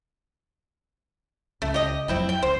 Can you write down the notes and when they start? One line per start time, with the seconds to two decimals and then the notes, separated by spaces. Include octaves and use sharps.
1.62 C#2 A3
1.74 G4 D#5
2.08 F2 F#3 C4 E4 G5
2.29 G5
2.43 C#2 C5